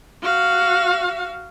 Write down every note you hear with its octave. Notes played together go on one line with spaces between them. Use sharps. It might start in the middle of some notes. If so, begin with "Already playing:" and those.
F#4 F5